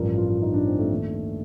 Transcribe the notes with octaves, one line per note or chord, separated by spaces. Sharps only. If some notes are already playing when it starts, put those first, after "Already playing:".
Already playing: A1 G2 F3 A#4
F4
F4
D#4
D4
C4
A3
D#2 D#3